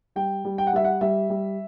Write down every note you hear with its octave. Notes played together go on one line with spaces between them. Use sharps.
G3 G5
G3
G5
F#5
G3 E5
F#5
G3 E5
G3